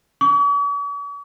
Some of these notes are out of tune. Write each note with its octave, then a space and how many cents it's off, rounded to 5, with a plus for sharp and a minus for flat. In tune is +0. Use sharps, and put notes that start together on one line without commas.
C#6 +45